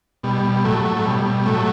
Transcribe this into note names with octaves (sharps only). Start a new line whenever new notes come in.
B2 G3
B2
A2 F#3 A3
A2
A3
B2 G3
B2
A2 F#3 A3